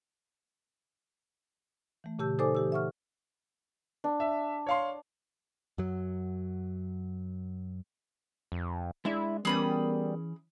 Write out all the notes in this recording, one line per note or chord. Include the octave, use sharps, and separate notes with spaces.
E3 A3
A#2 C#3 G4 A5 E6 G6
D#4 A4 C5 D5 G#5 D6
E3 G4 E6
E5 F#5 C#6 F6
D4
E5
C#5 F5 C6
F#2 F#3
F2
G#3 D4 E4 E5
E3 G3 B3 C#4 G#4 A#4 B5 D#6